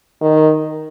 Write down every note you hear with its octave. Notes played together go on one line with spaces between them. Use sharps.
D#3